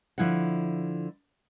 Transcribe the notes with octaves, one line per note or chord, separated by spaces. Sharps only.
D3 F3 E4 E5 F#5